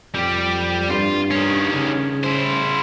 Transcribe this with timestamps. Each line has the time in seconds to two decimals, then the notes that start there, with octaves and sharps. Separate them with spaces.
0.15 F2 G3 G4
0.90 G2 F4
1.31 D#3 C#4
1.75 C#3
2.24 E4 C5